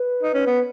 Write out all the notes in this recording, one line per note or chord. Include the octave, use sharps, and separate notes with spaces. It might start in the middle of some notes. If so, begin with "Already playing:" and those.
Already playing: B4
D#4
C#4
B3